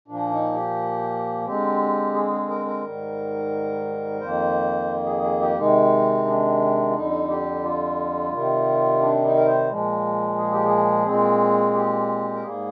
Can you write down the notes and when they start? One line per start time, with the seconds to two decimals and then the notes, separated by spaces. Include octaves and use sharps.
0.08 A#2 F3 A#3 D4
0.31 D#4
0.54 G4
1.45 D3 G#3 C4 G4
2.14 G#4
2.31 G#4
2.49 A#4
2.65 A#4
2.82 G#2 D#3 G3
4.20 F2 D#3 A#3 C5
5.05 G#4
5.23 G#4
5.41 G4
5.57 C3 D#3 G#3 D#4
6.25 D4
6.90 F4
6.94 F2 D3 G3 D#4
7.29 G4
7.63 F4
8.32 C3 D#3 G3
9.00 D4
9.23 D#4
9.37 A#4
9.46 C5
9.69 A#2 F3 G#3
10.38 G#4
10.51 G4
10.65 G#4
11.06 A#2 G#3 C4
11.75 G4
12.34 A#4
12.43 G#2 G3 A#3 G#4